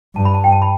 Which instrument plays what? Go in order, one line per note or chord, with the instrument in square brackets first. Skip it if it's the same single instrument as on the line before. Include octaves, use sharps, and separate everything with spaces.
[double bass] G2 [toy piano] A5
[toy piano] B5
A5
G5
A5
B5